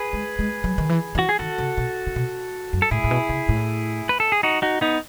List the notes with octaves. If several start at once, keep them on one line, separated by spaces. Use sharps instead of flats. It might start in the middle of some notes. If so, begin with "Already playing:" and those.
Already playing: G#4 B4
G#3
G#3
F#3
D#3
E3
E3
F#4
G#4
D#3 F#4 A4
C#3
B2
C#3
B2
F#2
A4
A2 E4 G#4
A2
B2
C#3
A2
B4
A4
G#4
D#4 F#4
D#4 F#4
B3 D#4